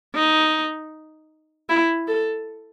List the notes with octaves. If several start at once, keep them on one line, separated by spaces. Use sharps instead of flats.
D#4
E4
A4